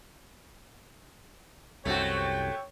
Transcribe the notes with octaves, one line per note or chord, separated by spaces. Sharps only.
C2 F#2 C3 A3 C4 F#4 C#5 G5